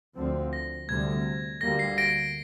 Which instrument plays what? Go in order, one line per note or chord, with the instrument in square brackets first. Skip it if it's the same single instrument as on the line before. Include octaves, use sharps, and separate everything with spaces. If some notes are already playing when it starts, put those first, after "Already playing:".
[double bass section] D2 D3 F3 C4
[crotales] A#6
[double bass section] D2 C3 G3 [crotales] G#6
[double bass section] D2 D3 G3 A#3 [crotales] A#6
[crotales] C7
A#6 D7